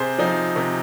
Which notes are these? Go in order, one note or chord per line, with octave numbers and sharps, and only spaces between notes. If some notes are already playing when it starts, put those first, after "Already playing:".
Already playing: C3 G#4 C5
F3 C4 D#4
C3